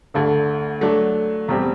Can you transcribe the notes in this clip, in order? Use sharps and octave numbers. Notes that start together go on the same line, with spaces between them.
D2 D3 A3
F#3 A3 D4
E2 B2 G3 C4 G4